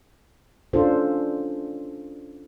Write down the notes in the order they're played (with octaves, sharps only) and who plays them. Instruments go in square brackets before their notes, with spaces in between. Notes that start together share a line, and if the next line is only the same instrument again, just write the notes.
[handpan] C#4 D4 F4 A4 C5